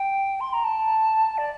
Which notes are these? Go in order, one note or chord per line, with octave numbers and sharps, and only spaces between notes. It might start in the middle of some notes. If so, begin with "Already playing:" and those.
Already playing: G5
C6
A#5
A5
D5